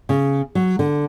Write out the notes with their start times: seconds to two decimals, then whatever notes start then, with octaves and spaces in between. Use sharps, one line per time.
0.09 C#3
0.55 F#3
0.79 D3